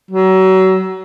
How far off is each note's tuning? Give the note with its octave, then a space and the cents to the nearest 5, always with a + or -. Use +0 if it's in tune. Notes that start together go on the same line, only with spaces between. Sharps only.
F#3 +30